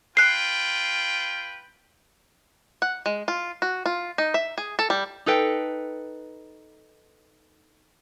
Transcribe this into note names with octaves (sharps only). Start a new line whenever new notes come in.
F4 B4 G5 F#6 C7
F#5
G#3
F4
F#4
F4
D#4
E5
G#4
A4
G3
D#4 A4 B4 G5